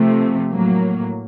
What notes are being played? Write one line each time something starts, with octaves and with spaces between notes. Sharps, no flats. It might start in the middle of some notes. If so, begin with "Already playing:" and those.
Already playing: C3 F3 A3
A2 F#3 A#3